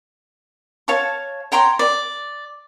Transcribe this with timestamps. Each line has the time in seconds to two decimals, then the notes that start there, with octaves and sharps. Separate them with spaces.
0.88 C#5 F5 A5 C#6
1.52 C#5 G5 A#5 C6
1.79 D5